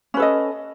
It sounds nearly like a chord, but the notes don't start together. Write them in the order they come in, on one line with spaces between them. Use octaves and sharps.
C#4 B4 A4 D#5